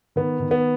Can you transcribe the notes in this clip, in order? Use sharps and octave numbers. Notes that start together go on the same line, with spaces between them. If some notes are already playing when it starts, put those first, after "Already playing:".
D#3 B3
D#3
B3